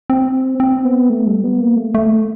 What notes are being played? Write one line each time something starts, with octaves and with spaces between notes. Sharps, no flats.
C4
C4
B3
A3
G3
B3
A#3
A3
A3